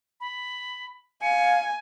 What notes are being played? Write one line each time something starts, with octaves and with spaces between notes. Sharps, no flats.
B5
F5 G#5 C#7